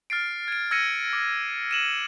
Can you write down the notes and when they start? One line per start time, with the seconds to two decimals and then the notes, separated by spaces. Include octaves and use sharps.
0.10 F6 A6 C7 D7
0.48 G#6 D7
0.71 E6 G#6 A#6 C#7 D#7
1.13 D6
1.71 D#7 E7 F#7